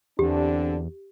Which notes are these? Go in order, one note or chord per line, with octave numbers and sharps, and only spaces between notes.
E2 D3 C4 D4 G4